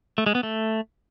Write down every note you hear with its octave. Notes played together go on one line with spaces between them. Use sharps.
A3
G#3
B3
A3